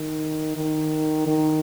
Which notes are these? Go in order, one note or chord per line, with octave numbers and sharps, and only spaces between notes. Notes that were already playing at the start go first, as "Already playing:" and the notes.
Already playing: D#3
D#3
D#3